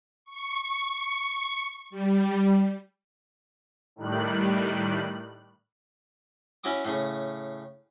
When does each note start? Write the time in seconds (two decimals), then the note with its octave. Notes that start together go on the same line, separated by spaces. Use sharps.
0.25 C#6
1.90 G3
3.96 A2 D#3 G3 F#6
6.64 C#4 E4 F#4 D6 D#6
6.85 A2 C#3